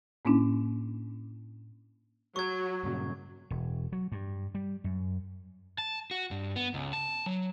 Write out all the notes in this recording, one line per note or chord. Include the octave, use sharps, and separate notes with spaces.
A2 A#3 C#4 D4 E4
F#3 C#6 G#6
G2 A#2 C#3
E1
F#3
G2
G3
F#2
A5
F#4
G2
B3
C#2
A5
F#3